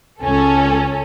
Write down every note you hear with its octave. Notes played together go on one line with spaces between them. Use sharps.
C#2 C#4 A4